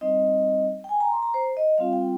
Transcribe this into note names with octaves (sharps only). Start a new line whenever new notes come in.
G3 C4 D#4 D#5
G5
G#5
A#5
C6
A#5
C5
D#5
G3 C4 F4 F5
G5